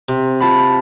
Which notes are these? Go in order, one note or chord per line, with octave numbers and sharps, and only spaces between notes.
C3
F4 A5 B5